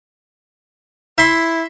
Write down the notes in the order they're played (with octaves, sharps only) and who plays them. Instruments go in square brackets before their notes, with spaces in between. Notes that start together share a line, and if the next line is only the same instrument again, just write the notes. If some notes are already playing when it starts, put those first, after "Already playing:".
[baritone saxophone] E4 [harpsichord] E5 C6